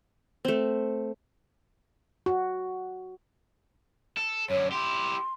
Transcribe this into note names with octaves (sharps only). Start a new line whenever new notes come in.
A3 C4
F#4
A4
F#2 D3 C#5
E4 G4 C6